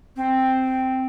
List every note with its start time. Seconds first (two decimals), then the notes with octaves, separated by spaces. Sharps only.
0.16 C4